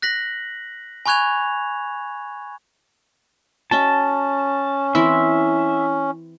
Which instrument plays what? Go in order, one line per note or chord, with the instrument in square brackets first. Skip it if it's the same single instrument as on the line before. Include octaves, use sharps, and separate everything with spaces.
[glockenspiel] F#6 A#6 B6 F#7
G#5 B5 C#6 F#6 G#6 F7
[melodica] C#4 [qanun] F#4 D#5 E5 [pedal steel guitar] A5
[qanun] E3 C4 E4 [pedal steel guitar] E5